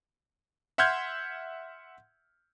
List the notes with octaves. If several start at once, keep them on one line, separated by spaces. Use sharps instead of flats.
E5 F#5 C6 F6 G6 G#6